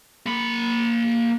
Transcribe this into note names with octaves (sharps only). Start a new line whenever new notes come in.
A#3 B5